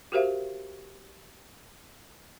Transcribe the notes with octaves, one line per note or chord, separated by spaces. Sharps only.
F#4 G4 A#4 C5 E5 F5